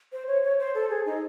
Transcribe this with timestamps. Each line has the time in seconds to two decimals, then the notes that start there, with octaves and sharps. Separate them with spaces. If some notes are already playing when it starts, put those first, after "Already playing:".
0.13 C5
0.27 C#5
0.43 C#5
0.59 C5
0.75 A4
0.90 G#4
1.06 D#4